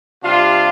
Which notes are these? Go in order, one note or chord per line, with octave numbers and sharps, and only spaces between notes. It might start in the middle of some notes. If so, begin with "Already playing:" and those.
C3 G3 D4 F4